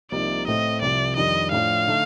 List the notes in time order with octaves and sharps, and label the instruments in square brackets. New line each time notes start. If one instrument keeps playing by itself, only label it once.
[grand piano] C2 C3 F3 A#3 D#4 [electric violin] D5
[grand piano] A2 A3 C4 [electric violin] D#5
[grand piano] C2 C3 F3 [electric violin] D5
[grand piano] F2 D#3 G3 D4 [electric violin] D#5
[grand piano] A2 F3 A3 D4 [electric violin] F5
[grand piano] D3 A3 D#4